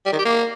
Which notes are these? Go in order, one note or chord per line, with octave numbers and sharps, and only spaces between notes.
G3
D#3
G4
A#3